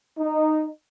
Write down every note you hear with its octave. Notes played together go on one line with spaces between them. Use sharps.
D#4